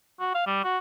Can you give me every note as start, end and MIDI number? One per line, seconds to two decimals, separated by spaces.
0.20 0.30 66
0.35 0.44 77
0.47 0.63 55
0.64 0.78 66